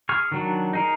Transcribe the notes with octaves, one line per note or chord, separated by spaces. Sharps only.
G#4 C#6 F6
D#3 F#3 D4
D#4 G#4 A#4